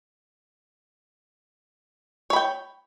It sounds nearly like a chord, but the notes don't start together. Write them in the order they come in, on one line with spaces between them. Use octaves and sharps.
C#5 B5 G5